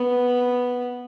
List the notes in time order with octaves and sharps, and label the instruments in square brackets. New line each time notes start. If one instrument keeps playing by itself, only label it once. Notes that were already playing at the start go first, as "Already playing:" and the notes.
Already playing: [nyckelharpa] B3